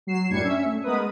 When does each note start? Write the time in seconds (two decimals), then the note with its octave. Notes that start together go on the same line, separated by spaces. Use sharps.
0.07 F#3 C7 E7
0.30 A1 F#2 G3 D4 G#6 C#7
0.43 C#4 E5
0.65 A3
0.83 G#3 B3 A#4 B4 D#6